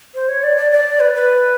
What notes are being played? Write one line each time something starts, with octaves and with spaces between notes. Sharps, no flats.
C5
C#5
D5
D5
D5
B4
B4